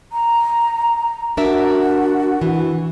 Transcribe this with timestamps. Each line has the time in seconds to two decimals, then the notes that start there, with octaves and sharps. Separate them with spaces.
0.12 A#5
1.37 D4 F#4 A#4 E5
2.41 E3